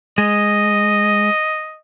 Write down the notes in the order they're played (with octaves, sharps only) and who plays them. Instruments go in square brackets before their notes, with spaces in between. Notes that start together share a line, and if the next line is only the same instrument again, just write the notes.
[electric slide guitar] G#3 [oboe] D#5